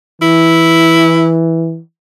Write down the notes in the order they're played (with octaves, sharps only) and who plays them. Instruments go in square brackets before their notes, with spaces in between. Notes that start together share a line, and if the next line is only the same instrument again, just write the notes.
[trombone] E3 [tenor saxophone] E4